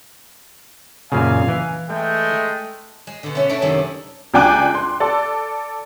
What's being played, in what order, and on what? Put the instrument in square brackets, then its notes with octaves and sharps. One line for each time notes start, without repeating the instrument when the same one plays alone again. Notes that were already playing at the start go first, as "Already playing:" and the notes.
[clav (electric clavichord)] F#2 A#2 C#3 [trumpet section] F5 G#5
[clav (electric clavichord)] E3
[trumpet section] G#3 A3 G5
[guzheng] G#3
B2 D3
A3 C#4 E5
D4 E4 A4 C#5
F#2 C3 D#3 G#3
[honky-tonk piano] C#2 D4 G5 G#5 D6 F#6
C6
A4 D5